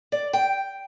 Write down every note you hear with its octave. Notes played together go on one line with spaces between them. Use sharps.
D5
G5